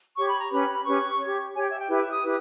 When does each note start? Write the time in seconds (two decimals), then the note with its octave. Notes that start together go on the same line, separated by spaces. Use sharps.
0.17 G4 C#5 C#6
0.29 B5
0.40 A#5
0.52 C#4 G4 B4 B5
0.75 B5
0.85 C#4 G4 B4 C#6
1.20 G4 C#5
1.54 G4 C#5 G#5
1.62 G5
1.71 E5
1.79 G5
1.88 E4 G4 B4
2.00 E5
2.11 D#6
2.23 E4 G4 B4